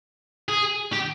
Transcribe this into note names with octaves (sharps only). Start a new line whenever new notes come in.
G#4
G4